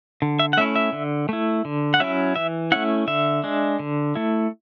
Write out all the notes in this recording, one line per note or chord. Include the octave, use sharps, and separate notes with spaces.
D3
E5
F#5
A3 C#4 E4 E5
E5
D3
A3 E4
D3
F#5
F#3 C#4 E4 E5
E3 E5
A3 C#4 E4 F#5
D3 E5
G#3 D4
D3
A3 E4